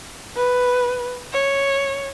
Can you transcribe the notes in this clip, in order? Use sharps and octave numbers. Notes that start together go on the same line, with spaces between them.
B4
C#5